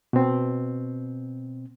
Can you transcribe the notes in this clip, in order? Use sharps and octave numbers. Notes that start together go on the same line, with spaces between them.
B2 C4